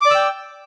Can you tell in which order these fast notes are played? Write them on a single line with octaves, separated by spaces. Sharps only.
D6 D5 E6 G5